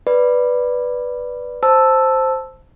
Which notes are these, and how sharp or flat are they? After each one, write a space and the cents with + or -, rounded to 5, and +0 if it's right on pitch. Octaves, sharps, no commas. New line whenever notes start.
B4 -5 D5 +0
C5 +0 A5 +0 E6 +0